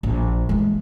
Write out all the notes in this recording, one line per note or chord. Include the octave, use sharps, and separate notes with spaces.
A#1
E3 G#3